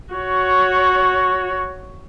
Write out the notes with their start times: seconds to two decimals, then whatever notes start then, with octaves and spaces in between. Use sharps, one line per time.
0.14 F#4 C#5